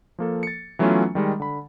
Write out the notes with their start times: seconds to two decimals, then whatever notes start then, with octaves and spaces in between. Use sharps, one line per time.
0.19 F3 A#3 A4
0.43 A6 C#7
0.79 E3 F#3 A3 B3 C#4 F4
1.15 D#3 G3 G#3
1.40 D3 B5